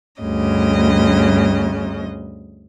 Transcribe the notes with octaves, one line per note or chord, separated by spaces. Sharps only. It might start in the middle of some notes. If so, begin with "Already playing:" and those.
D2 G2 C#3 D#5